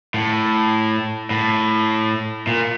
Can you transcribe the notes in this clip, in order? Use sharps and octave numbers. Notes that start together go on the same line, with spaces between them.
A2
A2
A#2